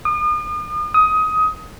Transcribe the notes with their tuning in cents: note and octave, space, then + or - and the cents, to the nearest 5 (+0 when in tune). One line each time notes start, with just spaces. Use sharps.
D#6 -40
D#6 +20